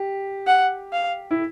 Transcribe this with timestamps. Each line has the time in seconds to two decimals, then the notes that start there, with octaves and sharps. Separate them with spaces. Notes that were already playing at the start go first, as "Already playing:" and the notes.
Already playing: G4
0.47 F#5
0.93 F5
1.31 E4